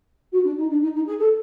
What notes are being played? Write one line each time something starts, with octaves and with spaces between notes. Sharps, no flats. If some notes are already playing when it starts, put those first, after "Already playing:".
F#4
D4
D#4
D4
D#4
D#4
G#4
A4